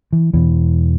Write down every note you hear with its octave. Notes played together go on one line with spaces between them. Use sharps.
E3
E2 B2 E3